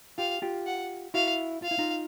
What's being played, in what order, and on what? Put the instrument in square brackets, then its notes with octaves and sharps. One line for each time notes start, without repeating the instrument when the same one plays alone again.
[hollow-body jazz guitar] F4 G4 [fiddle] F5
[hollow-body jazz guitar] F4 G4
[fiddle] F#5
[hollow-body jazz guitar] E4 F#4 [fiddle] F5
[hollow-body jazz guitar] F4 [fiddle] F5
[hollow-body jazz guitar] E4
D#4 F4